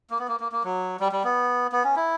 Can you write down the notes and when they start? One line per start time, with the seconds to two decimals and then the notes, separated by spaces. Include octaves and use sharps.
0.10 A#3
0.19 B3
0.28 A#3
0.40 A#3
0.52 A#3
0.64 F#3
1.00 G3
1.12 G3
1.24 B3
1.72 B3
1.84 C#4
1.96 E4